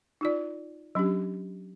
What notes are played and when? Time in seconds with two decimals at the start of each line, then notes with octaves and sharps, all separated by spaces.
0.21 D#4 F4 D5
0.95 F#3 C#4 D4 G4